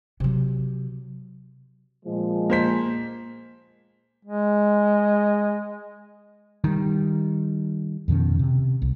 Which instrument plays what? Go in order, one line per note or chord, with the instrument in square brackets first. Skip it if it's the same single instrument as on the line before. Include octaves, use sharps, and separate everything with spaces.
[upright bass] C3 F#3
[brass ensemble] A#2 F3 G#3
[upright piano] A#3 C5 B6
[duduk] G#3
[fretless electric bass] D#3 G3
F2 B2 D#3 C#4
C3
C2